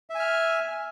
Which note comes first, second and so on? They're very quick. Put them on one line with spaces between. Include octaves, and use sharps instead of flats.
E5 G#5 F6